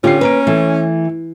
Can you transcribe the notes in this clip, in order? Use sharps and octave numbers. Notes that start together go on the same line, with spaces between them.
D3 C#4 F4 G4 C7
A#3 B4 A#5 D7
E3 A3